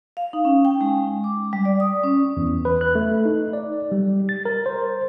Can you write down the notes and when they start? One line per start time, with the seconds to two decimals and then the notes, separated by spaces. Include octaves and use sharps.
0.17 F5
0.33 D#4
0.45 C#4
0.65 G5
0.81 G#3
1.24 D6
1.53 G3
1.65 D5
1.80 D#6
2.04 C#4
2.37 E2
2.65 B4
2.81 F#6
2.95 A3
3.25 D#4
3.53 D5
3.92 G3
4.29 A6
4.45 A#4
4.66 C5